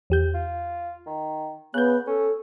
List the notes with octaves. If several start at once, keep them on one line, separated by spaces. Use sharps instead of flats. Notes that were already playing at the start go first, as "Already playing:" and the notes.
E2 G4 G6
F4
D#3
C#3 B3 F#6 G6
C#4 A4